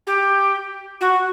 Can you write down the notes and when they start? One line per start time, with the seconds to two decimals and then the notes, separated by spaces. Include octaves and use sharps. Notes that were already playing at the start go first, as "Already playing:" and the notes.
0.06 G4
1.00 F#4